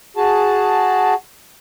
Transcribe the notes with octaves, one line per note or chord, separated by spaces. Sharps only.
F#4 G#4 A5